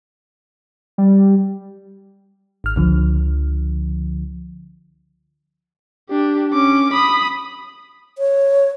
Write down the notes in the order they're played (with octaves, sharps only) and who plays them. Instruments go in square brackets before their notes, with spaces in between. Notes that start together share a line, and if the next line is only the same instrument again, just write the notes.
[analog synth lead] G3
[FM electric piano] G#1 F6
C#2 D3 F3
[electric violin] D4 G4
C#4 D6
B5 D#6
[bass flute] C#5